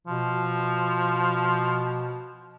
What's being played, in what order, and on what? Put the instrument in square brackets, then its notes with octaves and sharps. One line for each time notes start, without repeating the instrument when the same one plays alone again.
[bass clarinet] B2 [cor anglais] F3